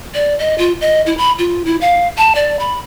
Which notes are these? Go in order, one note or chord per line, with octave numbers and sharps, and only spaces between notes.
D5
D#5
F4
D#5
E4
B5
F4
E4
F5
A5
D5
B5